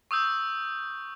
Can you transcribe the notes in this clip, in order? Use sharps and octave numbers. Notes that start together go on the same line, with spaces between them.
C#6 D#6 E6 G6